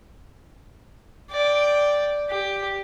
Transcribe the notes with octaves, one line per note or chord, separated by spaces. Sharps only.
D5 G5
G4